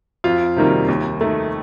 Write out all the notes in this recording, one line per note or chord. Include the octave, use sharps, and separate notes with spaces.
F2 F4
C3 D#3 G3 A#3
D#2
D#3 A3